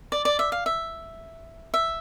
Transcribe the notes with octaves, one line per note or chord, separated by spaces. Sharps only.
D5
D5
E5
F5
E5
E5